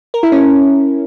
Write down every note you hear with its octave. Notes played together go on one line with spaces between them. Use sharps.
A#4
E4
C#4